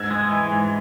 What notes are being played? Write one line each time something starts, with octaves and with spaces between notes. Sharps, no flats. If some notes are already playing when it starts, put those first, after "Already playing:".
Already playing: G#2 E6 G#6
G#3
E3
G#2